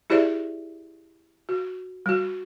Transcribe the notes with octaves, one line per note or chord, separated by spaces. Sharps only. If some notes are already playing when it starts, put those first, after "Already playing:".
E4 G4 G#4 C5 D5 E5
F#4
G3 F#4